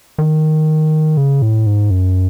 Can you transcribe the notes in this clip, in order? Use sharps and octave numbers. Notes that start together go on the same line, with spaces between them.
D#3
C#3
A2
G#2
F#2